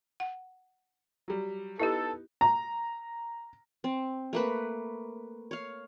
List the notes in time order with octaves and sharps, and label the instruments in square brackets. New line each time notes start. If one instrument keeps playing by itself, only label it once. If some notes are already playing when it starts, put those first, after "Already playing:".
[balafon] F#5
[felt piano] F#3 G3
[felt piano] B3 D#4 [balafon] E4 G4 [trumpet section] A4
[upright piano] A#5
[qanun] C4
A3 A#3 B4
C#5 F5